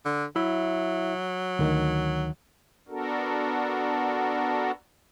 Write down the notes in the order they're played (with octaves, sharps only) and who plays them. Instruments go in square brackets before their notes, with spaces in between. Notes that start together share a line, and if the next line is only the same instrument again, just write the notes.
[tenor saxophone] D3
[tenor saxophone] F#3 [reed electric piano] E4 E5
[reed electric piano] D2 D#3
[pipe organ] B3 D4 F#4 A4 A#4